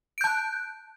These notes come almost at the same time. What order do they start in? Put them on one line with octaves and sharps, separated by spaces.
D7 G6 A5 F#6